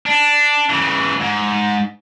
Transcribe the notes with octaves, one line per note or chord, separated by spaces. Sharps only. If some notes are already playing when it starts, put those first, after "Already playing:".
D4
C#3 E3
G#2